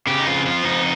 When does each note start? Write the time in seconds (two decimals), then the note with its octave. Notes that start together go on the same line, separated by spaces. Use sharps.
0.07 C#3 G4
0.20 D#4
0.27 F2 F4
0.46 F3 F4
0.65 F2 D#4